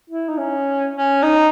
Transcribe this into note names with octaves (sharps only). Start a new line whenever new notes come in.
E4
D#4
C#4
C#4
D#4